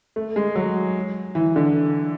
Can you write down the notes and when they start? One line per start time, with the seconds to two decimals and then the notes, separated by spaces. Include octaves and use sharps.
0.16 A3
0.36 G#3
0.56 F#3
1.35 E3
1.56 D3